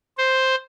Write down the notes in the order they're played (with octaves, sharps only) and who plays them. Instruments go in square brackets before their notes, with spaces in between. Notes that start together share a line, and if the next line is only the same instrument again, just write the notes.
[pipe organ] C5